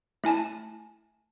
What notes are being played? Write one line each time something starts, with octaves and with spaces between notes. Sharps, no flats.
A3 E4 G#5 A5